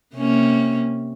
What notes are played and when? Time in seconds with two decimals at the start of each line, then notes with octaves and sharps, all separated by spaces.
0.15 C3 A#3 C#4